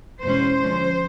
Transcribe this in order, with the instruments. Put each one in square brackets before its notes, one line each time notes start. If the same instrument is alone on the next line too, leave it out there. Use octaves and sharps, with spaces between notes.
[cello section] E2 B2 G#3 C#4 C5
D3 F3 G#3 C#4